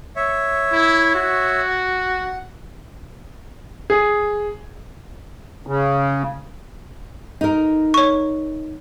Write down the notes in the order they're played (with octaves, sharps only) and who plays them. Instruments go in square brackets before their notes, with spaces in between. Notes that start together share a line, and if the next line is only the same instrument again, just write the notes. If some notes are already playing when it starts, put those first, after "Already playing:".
[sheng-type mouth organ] C#5 E5
[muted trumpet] E4
F#4
[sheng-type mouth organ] F#5
[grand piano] G#4
[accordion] C#3
[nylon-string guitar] D#4 A#4
[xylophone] C#5 C#6